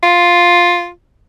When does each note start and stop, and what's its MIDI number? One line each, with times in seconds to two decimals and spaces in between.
0.03 0.89 65